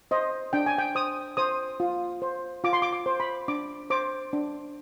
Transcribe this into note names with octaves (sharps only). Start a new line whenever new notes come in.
C5 D#5
D4 G5
G#5
G5
C5 D#6
C5 D#6
F4
C5
F4 D6
C6
D6
D6
C5
B5
D4 D6
C5 D6
D4